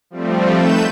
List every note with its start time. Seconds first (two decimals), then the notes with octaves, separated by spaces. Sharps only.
0.10 F3 G3 A3 C4
0.54 D#3 A3 B4 G6 E7